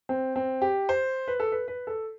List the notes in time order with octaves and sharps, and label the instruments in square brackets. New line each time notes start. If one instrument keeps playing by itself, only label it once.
[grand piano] C4
C4
G4
C5
B4
A4
B4
B4
A4